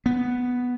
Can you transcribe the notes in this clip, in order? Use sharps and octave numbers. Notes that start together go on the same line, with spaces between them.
B3